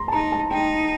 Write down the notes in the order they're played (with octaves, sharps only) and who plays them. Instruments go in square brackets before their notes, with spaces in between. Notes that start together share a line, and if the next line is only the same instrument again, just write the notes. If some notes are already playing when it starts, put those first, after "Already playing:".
Already playing: [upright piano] A#5 C6
A5
[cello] D#4 [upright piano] A#5
[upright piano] A5
[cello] D#4 [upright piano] G5